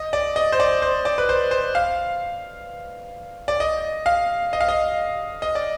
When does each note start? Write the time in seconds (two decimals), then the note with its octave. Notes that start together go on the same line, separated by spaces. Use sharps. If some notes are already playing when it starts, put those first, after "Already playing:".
Already playing: D#5
0.13 D5
0.36 D#5
0.52 C5
0.60 D5
0.82 C5
1.05 D5
1.18 B4
1.29 C5
1.51 C5
1.75 F5
3.48 D5
3.60 D#5
4.06 F5
4.53 D#5
4.61 F5
4.69 D#5
5.42 D#5
5.55 D5